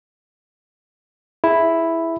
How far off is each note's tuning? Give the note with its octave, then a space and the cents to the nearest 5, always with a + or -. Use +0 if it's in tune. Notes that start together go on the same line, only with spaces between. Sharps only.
E4 +0 G#4 +0